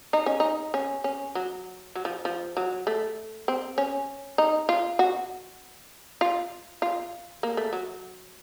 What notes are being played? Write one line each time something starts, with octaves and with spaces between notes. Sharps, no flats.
D#4
C#4
D#4
C#4
C#4
F#3
F#3
F3
F3
F#3
A3
C4
C#4
D#4
F4
F#4
F4
F4
A#3
A3
F#3